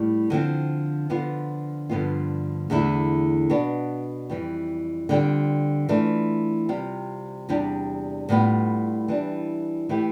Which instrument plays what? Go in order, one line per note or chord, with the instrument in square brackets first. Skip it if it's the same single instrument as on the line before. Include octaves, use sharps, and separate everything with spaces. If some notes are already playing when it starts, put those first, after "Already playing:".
Already playing: [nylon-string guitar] A2 G3
D3 F3 C4
D3 F3 B3 F4
G2 D3 F3 B3 F4
E2 D3 A3 E4
B2 B3 D4
F2 E3 G3
D3 G3 C4 F4
E3 A3 D4 F4
C3 G3 C4 F4
E2 C3 G3 D4 G4
A2 G3 B3 F4
E3 G3 D4
E3 A3 E4 G4